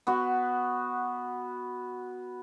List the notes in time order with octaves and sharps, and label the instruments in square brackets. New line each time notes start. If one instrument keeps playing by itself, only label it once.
[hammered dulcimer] B3 F#4